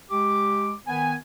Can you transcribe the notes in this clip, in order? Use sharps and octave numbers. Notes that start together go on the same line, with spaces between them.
G#3 G4 D6
D#3 B3 G#5